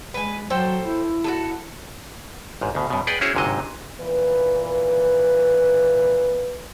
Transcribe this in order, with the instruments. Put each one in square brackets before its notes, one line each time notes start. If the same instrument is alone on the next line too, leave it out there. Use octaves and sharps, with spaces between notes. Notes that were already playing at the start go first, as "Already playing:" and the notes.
[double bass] G#3 [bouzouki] B4 G#5
[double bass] F#3 [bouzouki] A4 C5 G5
[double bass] E4
[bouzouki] F#4 G#4 A4
[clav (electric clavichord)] A1 G#2
D2 B2
F#2 B2
G#4 B4 D5 F#5 G5
C#4 E4 F#4 G#4 C5 C#5
G1 G#2 C3 F#3 D#5
[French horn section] A#2 E3 B4